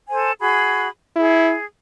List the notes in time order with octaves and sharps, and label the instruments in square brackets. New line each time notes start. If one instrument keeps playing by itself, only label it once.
[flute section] A4 C5 G#5
F#4 G#4 B5
[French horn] E4 [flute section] G#4